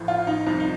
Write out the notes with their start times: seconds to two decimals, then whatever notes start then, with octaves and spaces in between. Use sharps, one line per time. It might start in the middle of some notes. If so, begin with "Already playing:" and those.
Already playing: A1 A2 F3
0.08 F4
0.27 D#4
0.46 C2 C3 F3 D#4
0.60 D#4